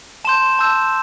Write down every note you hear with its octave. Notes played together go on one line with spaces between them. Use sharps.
A5 C6 G6 E7
A5 E6 G6